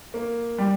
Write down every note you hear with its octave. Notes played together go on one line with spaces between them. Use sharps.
A#3
G3